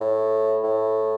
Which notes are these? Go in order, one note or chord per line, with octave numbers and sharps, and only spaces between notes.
A2
A2